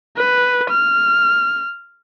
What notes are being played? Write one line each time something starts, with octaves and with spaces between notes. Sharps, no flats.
B4
F6